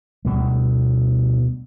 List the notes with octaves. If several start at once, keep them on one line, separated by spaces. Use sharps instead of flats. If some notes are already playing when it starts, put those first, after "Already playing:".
D2 B2 G3